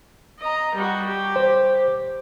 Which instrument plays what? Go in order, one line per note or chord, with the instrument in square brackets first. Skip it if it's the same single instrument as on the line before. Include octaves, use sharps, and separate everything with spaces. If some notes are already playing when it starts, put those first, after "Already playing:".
[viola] D#5 A#5
G3 F#4
G4
[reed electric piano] C5